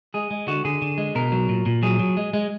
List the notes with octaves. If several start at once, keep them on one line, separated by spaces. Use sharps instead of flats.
G#3 G#4
G#3
D3 F#4
D3 G#4
D3
G#3
B2 A#4
F#3
A#2
A#2
F#3 G#4
F#3
G#3
G#3